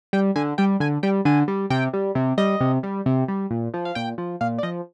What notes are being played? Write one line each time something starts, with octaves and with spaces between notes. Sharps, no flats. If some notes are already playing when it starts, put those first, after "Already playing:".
G3 G5
D3 G#5
G3 G5
D3 G#5
G3 G5
D3 G#5
G3
C3 G5
G3
C3
G3 D#5
C3
G3
C3
G3
A#2
F3
F5
A#2 G5
F3
A#2 F5
D5
F3 D#5